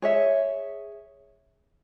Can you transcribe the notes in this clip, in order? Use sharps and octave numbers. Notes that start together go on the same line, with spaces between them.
G#4 C#5 E5